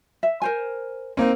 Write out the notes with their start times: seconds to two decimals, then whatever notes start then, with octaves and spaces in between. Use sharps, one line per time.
0.23 E5
0.42 A#4 C5 G#5
1.17 A#3 C4 C#4 D#4